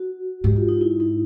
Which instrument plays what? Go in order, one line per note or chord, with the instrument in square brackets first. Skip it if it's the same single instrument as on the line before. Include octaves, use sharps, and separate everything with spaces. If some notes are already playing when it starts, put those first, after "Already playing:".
Already playing: [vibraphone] F#4
[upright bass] G#2 [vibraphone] G4
[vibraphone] F4
D#4
E4
D#4